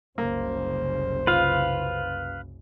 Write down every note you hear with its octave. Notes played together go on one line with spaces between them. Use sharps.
F#1 C2 C#3 A#3 C5
F4 B4 F5